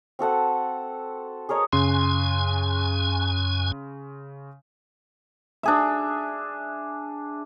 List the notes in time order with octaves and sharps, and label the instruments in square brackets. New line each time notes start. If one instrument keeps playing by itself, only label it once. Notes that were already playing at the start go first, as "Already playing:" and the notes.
[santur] C4 F#4 A4 F#5
G#4 A#4 C#5 D#5
[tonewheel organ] F#2 G#5 [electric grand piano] C#3 C6
[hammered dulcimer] D4 G#4 E5